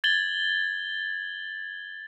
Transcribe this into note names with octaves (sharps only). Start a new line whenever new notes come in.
G#6 A6 F#7 G7